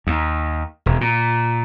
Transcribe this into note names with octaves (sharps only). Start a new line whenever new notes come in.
D#2
E1
A#2